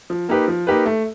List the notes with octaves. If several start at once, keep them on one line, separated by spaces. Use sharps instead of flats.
F3
A#3 D#4 G4 B4
F3
A#3 D#4 G4 B4
A3